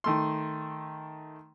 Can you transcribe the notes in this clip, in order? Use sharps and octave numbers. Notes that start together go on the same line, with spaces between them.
D#3 A3 C6